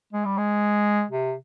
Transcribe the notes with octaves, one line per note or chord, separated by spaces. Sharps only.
G#3
G3
G#3
C3